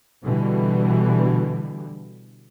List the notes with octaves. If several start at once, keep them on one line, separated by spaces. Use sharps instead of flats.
B2 D3 E3 G3